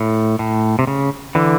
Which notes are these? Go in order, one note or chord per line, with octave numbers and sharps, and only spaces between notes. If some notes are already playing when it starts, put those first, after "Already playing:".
Already playing: A2
A2
C3
C#3
D3 E3